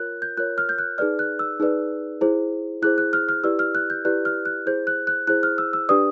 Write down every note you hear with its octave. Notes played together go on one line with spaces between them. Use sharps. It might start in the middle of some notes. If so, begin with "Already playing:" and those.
Already playing: F4 A#4 C#5 F#6
G6
F4 A#4 C#5 F#6
F6
G6
F#6
D#4 G#4 B4 D5 F6
F#6
E6
D#4 G#4 B4 D5
E4 G#4 C5
E4 G#4 C5 F#6
F#6
F6
F6
E4 G4 B4 D5 E6
F6
F#6
G6
E4 G4 B4 D5 F#6
F6
F#6
E4 G#4 C5 G6
F#6
F#6
E4 G#4 C5 F#6
F6
E6
E6
D4 G4 B4 D5 D#6